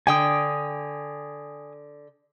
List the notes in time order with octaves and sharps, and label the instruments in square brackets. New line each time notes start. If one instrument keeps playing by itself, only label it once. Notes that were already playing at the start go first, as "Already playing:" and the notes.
[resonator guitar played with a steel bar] D3 G5 [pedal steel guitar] G#5 D#6